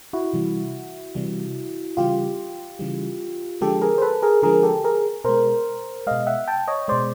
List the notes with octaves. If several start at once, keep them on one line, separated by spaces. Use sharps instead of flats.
E4 F#4
C3 E3 G3
C3 E3 G3
C#3 E3 G3 F4 G4
C#3 E3 G3
D3 F3 G#3 G4 A4
G#4 A#4
C5
A4 B4
G#4 A#4
D3 F3 G#3 G#4 A#4
G4 A4
G#4 A#4
B2 G#3 A#4 C5
B2 G#3 D#5 F5
E5 F#5
G5 A5
C#5 D#5
B2 G#3 C5 D5